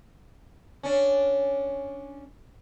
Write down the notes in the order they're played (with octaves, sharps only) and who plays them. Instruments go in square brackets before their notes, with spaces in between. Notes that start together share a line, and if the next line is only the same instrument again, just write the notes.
[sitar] C#4 D4